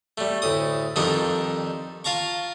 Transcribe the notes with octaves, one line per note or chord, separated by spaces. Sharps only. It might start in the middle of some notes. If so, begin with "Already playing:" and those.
G3 A3
D2 A2 D#6
F2 D#3 G3 D4 D#4 D#5
F4 F5 A5 A#5 C#6